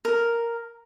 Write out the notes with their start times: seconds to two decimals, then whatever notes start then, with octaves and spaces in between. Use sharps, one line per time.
0.05 A#4